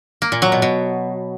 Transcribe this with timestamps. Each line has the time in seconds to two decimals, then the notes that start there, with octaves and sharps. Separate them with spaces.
0.22 A#3
0.32 A#2
0.42 F#3
0.52 B2
0.62 B2